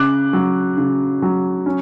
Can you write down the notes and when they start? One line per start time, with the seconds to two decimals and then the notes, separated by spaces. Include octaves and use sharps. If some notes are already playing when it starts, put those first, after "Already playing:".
Already playing: C#3 D6 F#6
0.33 F#3
0.77 C#3
1.22 F#3
1.66 C#4